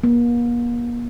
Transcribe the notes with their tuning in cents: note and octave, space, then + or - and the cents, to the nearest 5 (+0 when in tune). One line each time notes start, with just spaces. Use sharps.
A#3 +40